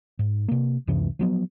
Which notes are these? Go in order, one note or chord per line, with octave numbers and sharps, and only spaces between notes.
G#2
C3 A#3
C#2 F#2 C3 E3
F3 F#3 B3